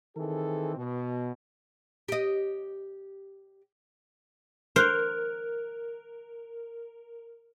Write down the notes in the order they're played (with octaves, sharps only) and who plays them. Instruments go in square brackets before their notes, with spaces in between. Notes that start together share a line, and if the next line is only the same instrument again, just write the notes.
[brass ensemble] D#3 E3 C4 G#4 A4
B2
[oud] G4 D#5
[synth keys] A#4 [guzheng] C5 [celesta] F6 F#6